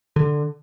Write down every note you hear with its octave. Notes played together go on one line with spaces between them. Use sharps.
D3